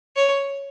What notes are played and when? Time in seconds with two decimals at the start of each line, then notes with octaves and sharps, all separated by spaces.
0.16 C#5